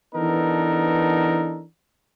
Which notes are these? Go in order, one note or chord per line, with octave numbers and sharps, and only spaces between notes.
E3 B3 D4 D#4 A4 A#4